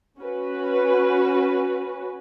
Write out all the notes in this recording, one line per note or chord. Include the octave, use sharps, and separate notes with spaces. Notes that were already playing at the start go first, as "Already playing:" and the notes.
C#4 F#4 B4